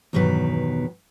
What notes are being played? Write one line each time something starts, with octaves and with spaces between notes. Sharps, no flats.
E2 G2 B2 D#3 F#3 B4